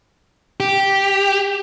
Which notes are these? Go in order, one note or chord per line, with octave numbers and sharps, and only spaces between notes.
G4